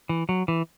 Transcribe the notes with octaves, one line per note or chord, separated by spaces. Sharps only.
E3
F#3
E3